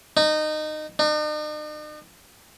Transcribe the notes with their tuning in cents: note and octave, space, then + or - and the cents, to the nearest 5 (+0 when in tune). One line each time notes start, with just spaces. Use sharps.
D#4 -20
D#4 -45